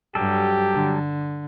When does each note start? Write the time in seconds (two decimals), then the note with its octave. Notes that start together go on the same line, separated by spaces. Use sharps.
0.15 G2 F#3 G3 G4 A4
0.74 D3